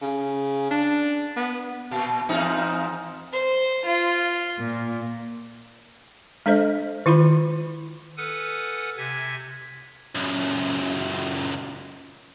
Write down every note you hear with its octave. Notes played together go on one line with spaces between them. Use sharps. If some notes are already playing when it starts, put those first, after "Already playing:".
C#3
D4
B3
A#2
E2 G#2 D#4
C5
F4
A#2
G#3 D4 A4 C5 D#5
D#3 E4 F4 C5 B5
A4 B4 F#5 G#5 D#6 F6
C3 E5 G#5 G#6
C#2 F#2